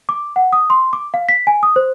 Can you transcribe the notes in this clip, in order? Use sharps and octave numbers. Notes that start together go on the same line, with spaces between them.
D6
F#5
D#6
C6
D6
F5
B6
G#5
D#6
C5